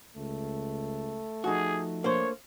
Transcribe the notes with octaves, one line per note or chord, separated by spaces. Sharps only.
C#2 A3
F3 D#4 F#4 G#4
A#3 D4 C5 C#5